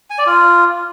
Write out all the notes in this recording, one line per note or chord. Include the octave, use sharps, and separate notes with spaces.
G#5
D5
F4